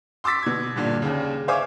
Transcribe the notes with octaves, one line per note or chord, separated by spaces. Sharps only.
C6 D6 E6 A6 B6
B2 G#6
G2 A#2 D3
D#2 C#3
C5 C#5 E5 F5 G#5 D6